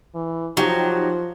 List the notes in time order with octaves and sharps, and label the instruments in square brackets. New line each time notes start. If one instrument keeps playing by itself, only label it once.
[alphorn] E3
[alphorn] F3 [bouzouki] F#3 [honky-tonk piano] D#4 G4 G5